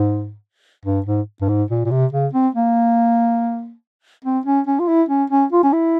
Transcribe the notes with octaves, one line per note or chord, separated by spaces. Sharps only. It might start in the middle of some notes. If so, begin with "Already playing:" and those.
Already playing: G#2
G2
G#2
G2
G#2
A#2
A#2
C3
C#3
C4
A#3
C4
C#4
C#4
F4
E4
C#4
C#4
F4
C#4
E4